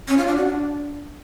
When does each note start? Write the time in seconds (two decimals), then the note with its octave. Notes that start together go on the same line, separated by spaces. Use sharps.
0.08 C#4
0.17 F4
0.27 D4
0.36 F#4
0.46 D4